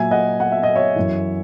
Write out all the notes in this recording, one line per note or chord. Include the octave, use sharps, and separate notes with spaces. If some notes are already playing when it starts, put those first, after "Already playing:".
Already playing: A#2 F#3 E5 G#5
D#5 F#5
F#5
E5
D#5
C#5 E5
F#2 E3